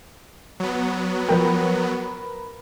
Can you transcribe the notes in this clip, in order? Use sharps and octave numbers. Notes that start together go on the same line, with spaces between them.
F#3 B3
F3 A#4 B4 G5